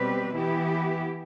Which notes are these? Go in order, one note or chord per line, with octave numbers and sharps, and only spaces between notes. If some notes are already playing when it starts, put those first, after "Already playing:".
Already playing: B2 G3 C4 G4 B4
E3 B3 E4 G4